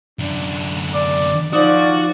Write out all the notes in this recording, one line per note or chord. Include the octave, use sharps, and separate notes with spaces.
F#2 D3 D4
D5
F3 D#4 F#4 D5 F#5